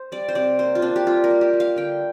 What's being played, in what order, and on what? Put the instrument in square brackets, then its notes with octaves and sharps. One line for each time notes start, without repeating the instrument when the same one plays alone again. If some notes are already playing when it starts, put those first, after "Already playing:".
Already playing: [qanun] C5
G3 D5
C5
C3 D5
A#3 C5
F4
A#3 D4
G4
G3 F4
A#4
A#3
G4
A#3
F5
D3 G5